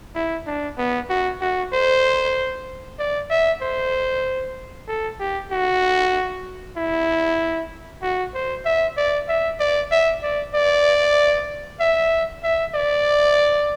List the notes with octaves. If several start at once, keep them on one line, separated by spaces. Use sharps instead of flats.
E4
D4
B3
F#4
F#4
C5
D5
E5
C5
A4
G4
F#4
E4
F#4
C5
E5
D5
E5
D5
E5
D5
D5
E5
E5
D5